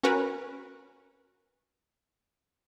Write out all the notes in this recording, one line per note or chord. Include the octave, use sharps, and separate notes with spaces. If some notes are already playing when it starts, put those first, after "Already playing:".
C#4 F#4 A#4 B4